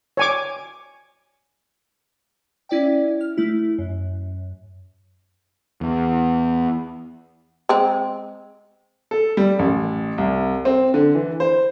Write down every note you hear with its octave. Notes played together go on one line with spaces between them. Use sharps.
C#5 G#5 D6
C#4 E4 D5 E5 G5
F6
A3 E4
F#2
E2
G#3 C4
A4
G3
A1
C2
C4
D3
E3
C5